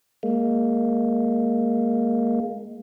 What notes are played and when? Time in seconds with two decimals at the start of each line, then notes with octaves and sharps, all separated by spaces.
0.23 G#3 A#3